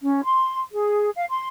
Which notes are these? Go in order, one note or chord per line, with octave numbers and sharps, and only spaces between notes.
C#4
C6
G#4
F5
C6